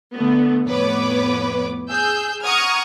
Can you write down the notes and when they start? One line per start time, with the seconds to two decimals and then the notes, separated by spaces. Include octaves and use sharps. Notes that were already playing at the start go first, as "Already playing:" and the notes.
0.15 D3 A3 B3
0.65 F2 A2 B3 B4 C#5 D6
1.89 G#4 E6 G6
2.44 F#5 A#5 C#6 D#6 F6 G#6